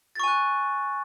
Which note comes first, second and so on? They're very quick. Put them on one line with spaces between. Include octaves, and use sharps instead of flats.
A6 C#6 G#5 F#6